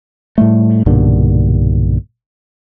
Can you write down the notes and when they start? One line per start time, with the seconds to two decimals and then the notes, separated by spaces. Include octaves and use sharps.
0.38 A2 G3 A3
0.86 B1 G2 A#2 D3